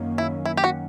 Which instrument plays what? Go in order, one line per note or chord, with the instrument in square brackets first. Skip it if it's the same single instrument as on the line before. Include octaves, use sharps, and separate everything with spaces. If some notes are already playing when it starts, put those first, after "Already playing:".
Already playing: [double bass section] F#2 D#3 F#3 A#3 C#4
[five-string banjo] E4
E4
G4
F#4